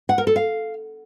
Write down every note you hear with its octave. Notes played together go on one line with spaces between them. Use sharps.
F#5
A#4
A4
F5